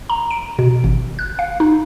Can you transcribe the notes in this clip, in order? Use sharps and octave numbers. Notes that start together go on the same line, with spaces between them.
A#5
D7
B2
G#1
F#6
F5
D#4